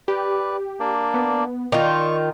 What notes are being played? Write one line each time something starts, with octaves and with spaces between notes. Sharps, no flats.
G4 B4 D5
A#3 D4 D5
B3
D#3 F4 D5 C#6